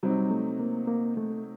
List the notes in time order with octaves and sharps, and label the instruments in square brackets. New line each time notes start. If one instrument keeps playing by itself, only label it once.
[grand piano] C3 F#3 C4 D#4 [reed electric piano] G3
[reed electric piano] A3
A#3
A#3
A3